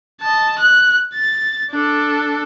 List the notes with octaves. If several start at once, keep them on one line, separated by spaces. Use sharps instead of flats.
D#5 A5
F#6
A6
D4 A4